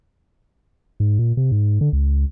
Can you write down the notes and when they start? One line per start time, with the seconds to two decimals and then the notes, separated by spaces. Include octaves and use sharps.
1.00 G#2
1.19 A#2
1.37 C3
1.51 G#2
1.81 D3
1.93 C#2